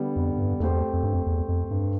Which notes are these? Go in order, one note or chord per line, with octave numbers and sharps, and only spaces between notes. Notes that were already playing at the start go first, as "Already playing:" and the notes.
Already playing: D3 G3 B3
F2
G2
E2 A3 C4 G4 C5
F2
G2
F2
E2
F2
G2